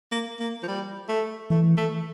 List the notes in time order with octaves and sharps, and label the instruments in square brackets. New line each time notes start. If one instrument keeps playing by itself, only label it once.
[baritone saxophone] A#3
A#3
F3
G3
A3
[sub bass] E3 [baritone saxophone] A3
[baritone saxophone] A3